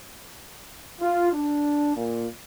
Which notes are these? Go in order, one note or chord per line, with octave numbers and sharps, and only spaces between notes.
F4
D4
A#2